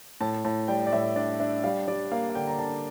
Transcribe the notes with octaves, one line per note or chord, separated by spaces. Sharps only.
A2 A5
A2 A5
G3 G5
D5
A2 E5
D4 D5
D4 E5
G3 F5
G3 D5
A#3 F5
F5
D3 G5
A#5
D3 A5